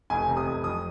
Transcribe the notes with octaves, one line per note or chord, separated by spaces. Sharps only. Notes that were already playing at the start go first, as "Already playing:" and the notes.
F1 G#5
C3
D#6
F1
F2 D#6